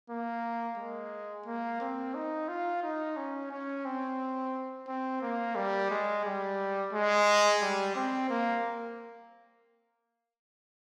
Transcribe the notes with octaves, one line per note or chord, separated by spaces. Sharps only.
A#3
G#3
A#3
C4
D#4
F4
D#4
C#4
C#4
C4
C4
A#3
G3
G#3
G3
G#3
G3
C4
A#3